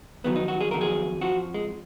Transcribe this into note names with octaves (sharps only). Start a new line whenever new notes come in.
F2 D#3 F#3 B3
D#4
F#4
G#4
F2 D#3 F#3 A#4
G#4
F2 F3 F#4
G#3